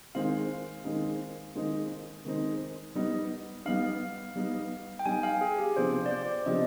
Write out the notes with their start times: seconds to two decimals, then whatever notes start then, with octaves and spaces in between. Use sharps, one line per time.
0.15 D#3 G#3 C4 D#4 F5
0.85 D#3 G#3 C4 D#4
1.55 D#3 G#3 C4 D#4
2.25 D#3 G#3 C4 D#4
2.95 G3 B3 D#4
3.65 G3 B3 D#4 F5
4.36 G3 B3 D#4
4.99 G5
5.05 G3 B3 D#4 G#5
5.23 F5
5.41 G#4
5.58 G4
5.76 C3 F3 B3 D4 G4 C5
6.06 D5
6.11 C5
6.46 C3 F3 B3 D4 G4 D#5